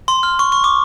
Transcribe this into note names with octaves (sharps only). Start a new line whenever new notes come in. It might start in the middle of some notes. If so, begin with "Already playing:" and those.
C6
F6
C#6
C#6
D6